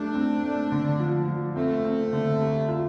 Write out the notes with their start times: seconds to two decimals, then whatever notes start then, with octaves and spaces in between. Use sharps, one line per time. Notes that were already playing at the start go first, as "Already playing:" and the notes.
Already playing: G3 A3 D4
0.15 C4
0.43 A3
0.72 D3
1.00 F3
1.28 F3
1.56 A3 C4
1.84 C4
2.13 D3
2.41 C2
2.69 F4